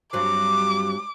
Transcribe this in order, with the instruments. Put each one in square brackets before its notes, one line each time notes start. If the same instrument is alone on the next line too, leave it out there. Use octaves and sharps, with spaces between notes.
[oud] G2 F#3 C4 [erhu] D6